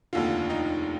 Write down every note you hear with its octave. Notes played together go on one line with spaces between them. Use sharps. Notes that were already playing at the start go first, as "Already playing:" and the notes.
F1 D#2 D3 F4
D#4